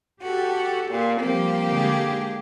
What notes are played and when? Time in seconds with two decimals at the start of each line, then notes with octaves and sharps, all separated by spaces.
0.22 F#4 G4 A4
0.90 A#2
1.20 F3 G3 A#3 C4 G4
1.69 D3 G#3 G#4